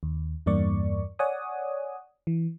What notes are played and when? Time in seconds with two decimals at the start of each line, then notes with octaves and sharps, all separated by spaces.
0.03 D#2
0.46 E2 G2 A#3 D5 C#6
1.19 C#5 D5 F#5 G#5 D#6
2.27 E3